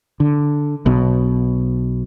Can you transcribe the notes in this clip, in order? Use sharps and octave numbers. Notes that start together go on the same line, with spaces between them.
D3
B1 B2